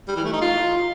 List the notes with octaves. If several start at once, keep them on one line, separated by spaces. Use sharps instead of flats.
G3
E3
A3
D#4
F4